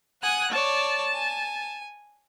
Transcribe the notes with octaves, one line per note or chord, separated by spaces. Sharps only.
F#5 G#5 D#6 F#6
C#5 D5 A5
G#5